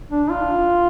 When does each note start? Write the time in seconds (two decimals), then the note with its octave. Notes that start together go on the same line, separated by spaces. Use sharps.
0.10 D4
0.30 F4